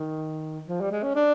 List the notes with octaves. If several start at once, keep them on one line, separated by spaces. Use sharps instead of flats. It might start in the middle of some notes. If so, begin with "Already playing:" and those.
Already playing: D#3
F3
G3
G#3
C#4
D4